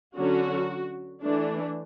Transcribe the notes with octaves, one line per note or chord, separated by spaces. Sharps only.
D3 F#3 C#4 F#4
E3 A3 D4